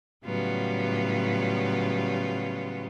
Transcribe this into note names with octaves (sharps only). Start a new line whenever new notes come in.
A2 C#3 F#3 G3 B3 F4